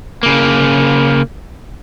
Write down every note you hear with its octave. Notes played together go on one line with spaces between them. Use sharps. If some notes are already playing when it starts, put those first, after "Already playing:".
C#3 A#3